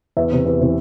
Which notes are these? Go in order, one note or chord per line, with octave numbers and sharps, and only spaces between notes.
E2 E5
C3 E3
E2
C3 E3